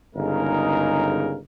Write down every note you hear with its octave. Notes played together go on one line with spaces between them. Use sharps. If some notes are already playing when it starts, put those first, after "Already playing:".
G1 C#3 G#3 D#4 A#4